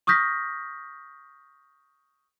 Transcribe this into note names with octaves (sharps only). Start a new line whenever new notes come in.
C#6 D#6 F6 G6 A#6 B6